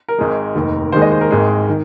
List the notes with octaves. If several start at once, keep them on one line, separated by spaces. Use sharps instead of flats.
A#4
G#1 G#2 G#3
F1 D#2 D#3
D#2 D#3 G#3 C5
D#5
C5
A#4
G#1 G#2 G#3
D#3